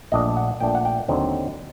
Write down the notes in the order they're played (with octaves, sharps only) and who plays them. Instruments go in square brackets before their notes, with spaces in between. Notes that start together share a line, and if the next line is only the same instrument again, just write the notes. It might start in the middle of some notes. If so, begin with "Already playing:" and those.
[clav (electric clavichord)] A#1 A#2 A3 D4 D#5
F#5
A#1 A#2 A3 D4 G5
F#5
G5
D#2 D3 F#3 C4 D#4